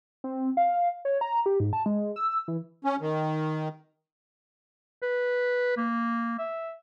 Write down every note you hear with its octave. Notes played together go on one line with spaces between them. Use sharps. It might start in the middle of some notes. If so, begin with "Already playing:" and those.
C4
F5
C#5
A#5
G4
G#2
A5
G#3
E6
E3
C#4
D#3
B4
A#3
E5